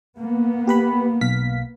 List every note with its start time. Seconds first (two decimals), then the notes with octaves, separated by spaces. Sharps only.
0.18 A#3 B3
0.67 G4 B4 B5
1.21 B1 F5 B6